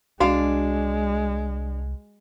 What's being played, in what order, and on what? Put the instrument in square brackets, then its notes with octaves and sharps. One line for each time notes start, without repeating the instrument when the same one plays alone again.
[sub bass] C2 [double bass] G#3 [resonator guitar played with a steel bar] D4 F5 [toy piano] F#4